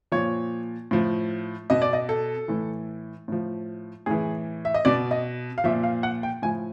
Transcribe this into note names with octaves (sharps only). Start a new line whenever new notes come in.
A#2 F3 C#5
A2 F3
B2 D#5
D5
D#5
A4
A2 E3
A2 F3
A2 E3 G#4
E5
D#5
B2 D5
D#5
F5
A#2 F3 E5
F5
F#5
G5
A2 F3 G#5